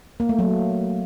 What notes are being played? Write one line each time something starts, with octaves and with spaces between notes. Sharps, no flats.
A#3
A3
F#3